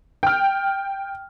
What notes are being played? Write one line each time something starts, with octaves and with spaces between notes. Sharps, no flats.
G5 F6